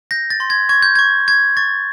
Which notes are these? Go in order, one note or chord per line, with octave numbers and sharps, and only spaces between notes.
G6 A#6
A6
C6
G#6
C#6 G#6
G6
C#6 G#6
C#6 G#6
C#6 A6